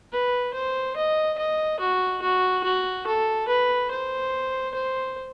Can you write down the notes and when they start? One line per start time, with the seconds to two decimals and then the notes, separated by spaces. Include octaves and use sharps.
0.12 B4
0.54 C5
0.97 D#5
1.38 D#5
1.80 F#4
2.22 F#4
2.64 F#4
3.07 A4
3.48 B4
3.91 C5
4.75 C5